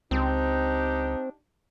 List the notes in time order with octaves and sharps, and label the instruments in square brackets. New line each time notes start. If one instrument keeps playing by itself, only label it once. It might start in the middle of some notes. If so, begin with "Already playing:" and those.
[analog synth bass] C#2 [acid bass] C4 [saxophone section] D4 D#4 G4